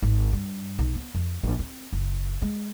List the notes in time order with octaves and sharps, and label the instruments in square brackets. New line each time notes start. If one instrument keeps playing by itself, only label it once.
[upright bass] G#1
G2
B1
B3
F2
A#1
C4
F#1
G#3